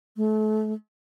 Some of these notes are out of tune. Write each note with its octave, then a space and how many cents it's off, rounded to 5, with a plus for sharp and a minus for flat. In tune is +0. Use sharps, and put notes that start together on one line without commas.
A3 -30